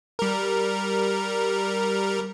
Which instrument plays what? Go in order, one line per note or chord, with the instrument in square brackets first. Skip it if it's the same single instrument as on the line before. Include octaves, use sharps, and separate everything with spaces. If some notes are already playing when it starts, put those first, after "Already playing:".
[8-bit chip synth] G3 A#4